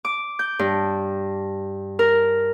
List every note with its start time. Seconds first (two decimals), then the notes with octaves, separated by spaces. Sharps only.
0.05 D6
0.39 G6
0.59 G2
1.99 A#4